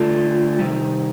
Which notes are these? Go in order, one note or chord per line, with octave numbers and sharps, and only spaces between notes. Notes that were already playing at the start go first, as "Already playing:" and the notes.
Already playing: D3 A3 D4 F4
C3 D#3 G3